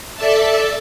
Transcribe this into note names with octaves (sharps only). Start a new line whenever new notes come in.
A4 D5 E5 A5